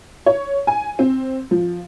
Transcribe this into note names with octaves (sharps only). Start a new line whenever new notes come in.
C#5
G#5
C4
F3